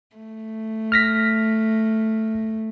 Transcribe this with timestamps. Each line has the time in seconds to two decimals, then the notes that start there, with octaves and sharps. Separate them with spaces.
0.16 A3
0.92 F6 A#6 B6